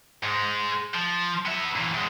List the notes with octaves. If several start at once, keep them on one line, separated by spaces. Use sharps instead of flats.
G#2 G#3
F3
B3 E5
A#2 E3
E2 G#3